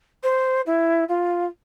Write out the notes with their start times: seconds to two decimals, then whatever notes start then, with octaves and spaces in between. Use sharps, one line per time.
0.23 C5
0.66 E4
1.08 F4